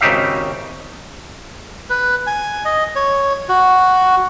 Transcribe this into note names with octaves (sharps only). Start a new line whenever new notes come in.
G#1 C#3 D#4 G4 E5 F5
B4
G#5
D#5
C#5
F#4